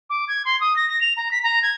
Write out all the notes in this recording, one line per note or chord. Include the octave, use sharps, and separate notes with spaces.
D6
G#6
C6
D#6
A#6
A#6
F7
A#5
B6
A#5
G#6